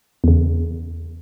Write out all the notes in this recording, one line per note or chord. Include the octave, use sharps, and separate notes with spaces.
E2 C#3